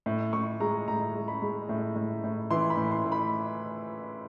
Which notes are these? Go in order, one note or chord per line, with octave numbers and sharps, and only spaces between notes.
A2
A2 C#6
G#3 A#5
A2 A#5
G#3
B5
G#3
A2
A2
A2
E3 C6
B5
A2
C6
A2
B5